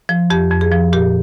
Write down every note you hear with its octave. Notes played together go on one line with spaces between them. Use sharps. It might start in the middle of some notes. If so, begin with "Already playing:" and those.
F3
F2 G4
F2
G#4
F3
A#2 G4